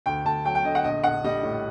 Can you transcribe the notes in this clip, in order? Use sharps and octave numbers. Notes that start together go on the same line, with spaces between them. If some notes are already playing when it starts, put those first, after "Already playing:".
D2 G5
D2 A5
F#3 G5
G5
D3 D#5
F#5
A#1 D#5
A#1 F#5
G3 D#5
A2